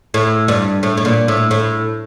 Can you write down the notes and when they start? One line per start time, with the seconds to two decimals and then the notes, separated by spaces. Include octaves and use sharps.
0.14 A2
0.48 G2
0.83 A2
0.97 A2
1.05 A#2
1.28 A2
1.51 A2